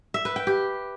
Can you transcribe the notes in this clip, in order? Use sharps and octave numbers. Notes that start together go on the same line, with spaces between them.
E5
B4
G5
G4